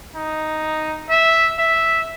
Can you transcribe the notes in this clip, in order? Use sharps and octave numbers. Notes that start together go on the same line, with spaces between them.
D#4
E5
E5